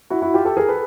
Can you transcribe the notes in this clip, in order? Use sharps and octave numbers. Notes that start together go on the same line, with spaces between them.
E4 F#4
E4 F#4
F4 G4
G4 A4
G#4 A#4
A4 B4